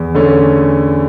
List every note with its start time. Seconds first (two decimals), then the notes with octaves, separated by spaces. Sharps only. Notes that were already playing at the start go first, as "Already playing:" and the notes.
Already playing: E2
0.15 D3 A3 C#4